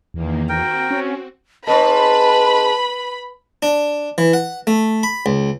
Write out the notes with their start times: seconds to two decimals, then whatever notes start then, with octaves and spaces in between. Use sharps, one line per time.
0.14 E2 D#3 A#3
0.49 C4 F#4 A#4 G5
0.91 C#4
1.67 G#2 C4 B4 D#5 A5 B5
3.63 D4
4.18 E3
4.33 F#5
4.67 A3
5.03 B5
5.26 C#2